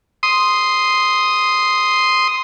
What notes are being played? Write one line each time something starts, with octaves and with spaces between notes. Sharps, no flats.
C6 D#6